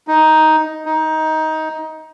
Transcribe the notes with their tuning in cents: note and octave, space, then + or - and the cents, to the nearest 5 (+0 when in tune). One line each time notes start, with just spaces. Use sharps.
D#4 +5
D#4 +15